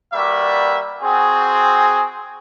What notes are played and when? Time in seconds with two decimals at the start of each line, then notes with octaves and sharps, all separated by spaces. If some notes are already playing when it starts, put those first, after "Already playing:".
0.13 G3 A#3 F#4 B4 D5 E5
1.02 C4 F#4 G#4